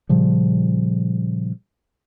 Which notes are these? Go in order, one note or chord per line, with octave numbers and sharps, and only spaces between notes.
A#2 C#3 F3 G3